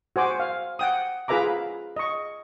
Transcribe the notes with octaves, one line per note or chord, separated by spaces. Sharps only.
F#4 C5 G#5 D6
F5
F#5 G5 D#6
F4 G#4 B4 E5 A#5 D6
D#5 C#6